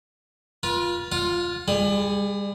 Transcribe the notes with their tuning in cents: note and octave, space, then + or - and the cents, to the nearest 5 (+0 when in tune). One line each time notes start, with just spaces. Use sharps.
F4 +0 B4 -40
F4 +0 F5 +45
G3 +35 G#4 +0